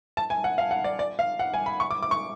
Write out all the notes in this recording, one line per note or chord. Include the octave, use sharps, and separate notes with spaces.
A5
G#5
F#5
F5
F#5
D5
D5
F5
F#5
G#5
B5
C#6
D6
D6
C#6